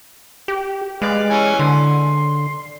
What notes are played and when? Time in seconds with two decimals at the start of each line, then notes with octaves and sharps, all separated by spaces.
0.48 G4
1.02 G#3 B4 D5 F5
1.30 E3 C#4 G#5
1.59 D3 C6